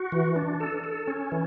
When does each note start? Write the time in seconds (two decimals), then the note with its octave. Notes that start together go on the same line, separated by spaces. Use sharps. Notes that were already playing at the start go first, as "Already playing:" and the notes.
Already playing: F#4
0.12 E3
0.36 D4
0.60 A4
0.84 A4
1.08 C#4
1.32 E3